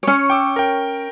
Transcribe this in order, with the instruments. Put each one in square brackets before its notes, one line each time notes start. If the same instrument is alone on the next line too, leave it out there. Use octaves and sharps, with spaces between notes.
[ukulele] C#4 C#5
[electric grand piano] G5 D6 E6
A#4 G5